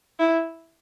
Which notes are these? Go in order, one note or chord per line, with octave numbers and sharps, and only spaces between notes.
E4